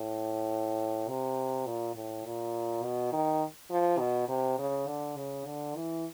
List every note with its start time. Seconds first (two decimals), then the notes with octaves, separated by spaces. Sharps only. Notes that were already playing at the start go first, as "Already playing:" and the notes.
Already playing: A2
1.08 C3
1.66 A#2
1.95 A2
2.25 A#2
2.83 B2
3.13 D#3
3.71 F3
3.99 B2
4.28 C3
4.58 C#3
4.87 D3
5.16 C#3
5.46 D3
5.75 E3